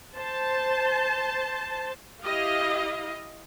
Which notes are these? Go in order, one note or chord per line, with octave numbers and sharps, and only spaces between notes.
C5 A5
E4 G4 D#5 F5